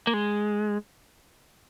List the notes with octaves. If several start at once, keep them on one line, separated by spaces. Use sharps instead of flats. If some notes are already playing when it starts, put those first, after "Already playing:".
A#3
G#3